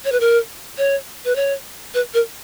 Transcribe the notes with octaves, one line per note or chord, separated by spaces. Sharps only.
C#5
B4
A#4
C#5
B4
C#5
B4
A#4